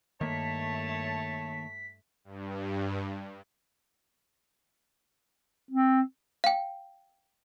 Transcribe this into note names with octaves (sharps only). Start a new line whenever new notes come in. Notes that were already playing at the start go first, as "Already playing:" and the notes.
G2 D#3 A3 A#3 C#5 A5 B6
G2
C4
F5 G5